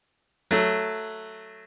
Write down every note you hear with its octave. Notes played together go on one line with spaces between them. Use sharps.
F#3 A3